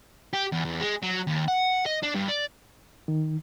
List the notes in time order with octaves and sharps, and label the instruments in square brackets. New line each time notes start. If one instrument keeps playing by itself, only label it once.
[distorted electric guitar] G4
E2
E2
G#3
F#3
D#2
F#5
D#5
D4
G2
D5
[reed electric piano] D#3